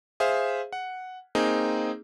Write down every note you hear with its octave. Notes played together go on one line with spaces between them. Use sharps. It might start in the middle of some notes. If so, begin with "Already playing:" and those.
G#4 C5 E5 F5
F#5
A#3 C4 D#4 G#4